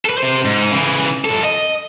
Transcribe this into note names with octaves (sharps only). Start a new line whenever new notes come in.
A4 B4
C3 C5
G#2
C#3 E3
F#2 A4
D#5